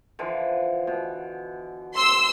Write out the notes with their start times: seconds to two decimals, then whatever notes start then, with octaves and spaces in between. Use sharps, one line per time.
0.19 D3 E3 F3
0.87 B2
1.95 C6 E6